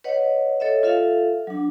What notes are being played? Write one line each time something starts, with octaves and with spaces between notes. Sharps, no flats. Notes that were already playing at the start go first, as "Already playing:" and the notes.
B4 C#5 D#5 F#5
A4 C#5 D#5 E5
F4 A4 E5 F5
F#3 D4